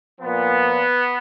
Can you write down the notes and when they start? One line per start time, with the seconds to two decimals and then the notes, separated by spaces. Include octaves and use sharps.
0.20 A#2 F3 B3